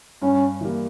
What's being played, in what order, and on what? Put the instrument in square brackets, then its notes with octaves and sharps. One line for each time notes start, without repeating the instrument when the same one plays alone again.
[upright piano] G2 [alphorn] C#4
[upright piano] E3 G3 A#3